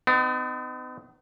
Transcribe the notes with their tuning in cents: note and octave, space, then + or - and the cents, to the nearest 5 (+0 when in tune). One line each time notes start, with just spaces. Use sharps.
B3 +45 D#4 -20